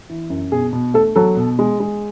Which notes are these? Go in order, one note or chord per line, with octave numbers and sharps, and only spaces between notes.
E3
F#2
B2 G#4
B2
A3 A4
F#3 A4
B2
G#3
G#3